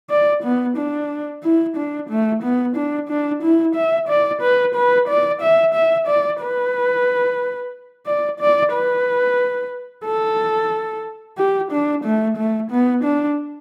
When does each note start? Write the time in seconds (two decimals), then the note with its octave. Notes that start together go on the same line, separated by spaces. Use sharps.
0.10 D5
0.43 B3
0.77 D4
1.44 E4
1.77 D4
2.09 A3
2.43 B3
2.76 D4
3.09 D4
3.42 E4
3.75 E5
4.09 D5
4.41 B4
4.75 B4
5.08 D5
5.41 E5
5.74 E5
6.07 D5
6.41 B4
8.06 D5
8.40 D5
8.73 B4
10.05 A4
11.38 G4
11.72 D4
12.05 A3
12.37 A3
12.71 B3
13.04 D4